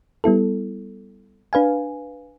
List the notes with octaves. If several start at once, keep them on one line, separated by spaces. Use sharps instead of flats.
G3 B3 E4 A4
D4 B4 F5 G#5